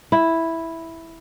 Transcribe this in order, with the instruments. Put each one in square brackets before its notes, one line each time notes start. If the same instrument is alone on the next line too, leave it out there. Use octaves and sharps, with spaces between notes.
[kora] E4